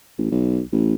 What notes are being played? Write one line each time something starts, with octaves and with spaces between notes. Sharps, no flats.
A1
B1
A1